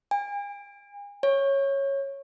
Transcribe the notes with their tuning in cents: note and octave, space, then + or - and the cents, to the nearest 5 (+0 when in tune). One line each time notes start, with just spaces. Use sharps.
G#5 -40
C#5 -10